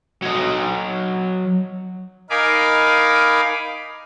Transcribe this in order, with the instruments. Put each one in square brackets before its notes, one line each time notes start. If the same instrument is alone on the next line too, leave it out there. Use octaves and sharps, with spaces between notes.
[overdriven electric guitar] F#3 D#5
[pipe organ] D#4 A#4 F5 G#5 B5 D6